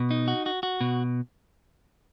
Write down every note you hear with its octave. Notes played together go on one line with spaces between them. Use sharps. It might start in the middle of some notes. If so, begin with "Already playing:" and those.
Already playing: B2
D#4
F#4
F#4
F#4
B2